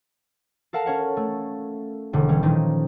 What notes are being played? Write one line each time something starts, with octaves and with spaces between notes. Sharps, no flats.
A4 A#4 F5 F#5 A5
C#4 C#5 F#5
A3
E1 D3
E3 G3 C#4
A#2 D#3 F3 D#4